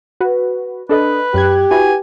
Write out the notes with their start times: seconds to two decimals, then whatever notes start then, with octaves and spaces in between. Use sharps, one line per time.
0.21 F#4 B4
0.89 D4 A4 B4 D#5
1.34 F#2 G4 F#6 G#6
1.71 E4 F#4 B4 G#5